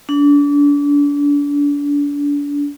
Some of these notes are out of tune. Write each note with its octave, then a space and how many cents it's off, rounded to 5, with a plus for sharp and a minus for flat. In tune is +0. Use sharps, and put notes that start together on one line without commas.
D4 -35